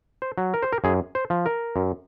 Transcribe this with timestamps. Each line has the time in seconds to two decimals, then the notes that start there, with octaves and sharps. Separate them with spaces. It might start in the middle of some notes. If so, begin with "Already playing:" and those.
0.22 C5
0.38 F#3
0.54 A#4
0.63 C5
0.72 A#4
0.84 F#2 G#4
1.15 C5
1.30 F3
1.46 A#4
1.76 F#2